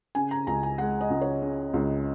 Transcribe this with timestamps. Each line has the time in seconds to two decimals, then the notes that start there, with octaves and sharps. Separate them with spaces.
0.15 C#3 G#5
0.31 A#5
0.47 C#2 A#5
0.63 G#5
0.78 G#3 F#5
1.01 D#5
1.10 C#2
1.21 C#5
1.42 C#3
1.74 C#2